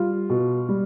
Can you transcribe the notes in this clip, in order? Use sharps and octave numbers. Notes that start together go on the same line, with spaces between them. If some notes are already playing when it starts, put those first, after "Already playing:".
Already playing: G3 F4
B2
G3